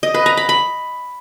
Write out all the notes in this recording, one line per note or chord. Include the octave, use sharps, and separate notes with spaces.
D#5
B4
A#5
B5
B5